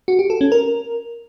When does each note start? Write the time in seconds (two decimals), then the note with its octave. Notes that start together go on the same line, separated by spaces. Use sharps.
0.08 F#4
0.19 G4
0.30 A4
0.41 C#4
0.52 A#4